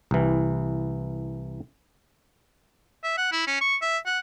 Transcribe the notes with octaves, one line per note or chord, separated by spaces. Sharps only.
C2 E3
E5
F#5
E4
C#4
C#6
E5
F#5